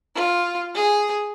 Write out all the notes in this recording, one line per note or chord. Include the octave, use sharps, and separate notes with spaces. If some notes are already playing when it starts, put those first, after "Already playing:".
F4
G#4